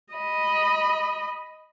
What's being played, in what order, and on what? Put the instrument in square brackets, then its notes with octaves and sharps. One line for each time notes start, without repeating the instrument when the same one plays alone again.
[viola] D#5 B5